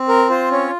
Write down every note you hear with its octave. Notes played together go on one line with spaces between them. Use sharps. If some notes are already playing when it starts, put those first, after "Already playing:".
Already playing: C4
A#4
F4 C5
C#4 C#5